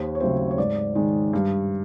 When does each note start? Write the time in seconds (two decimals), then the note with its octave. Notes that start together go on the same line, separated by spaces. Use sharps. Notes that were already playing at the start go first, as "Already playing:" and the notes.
Already playing: D#2 C5
0.15 C#5
0.20 C#3 F#3 A3 C4 C5
0.51 C#5
0.58 G#2 D5
0.95 D#3 G#3
1.33 G2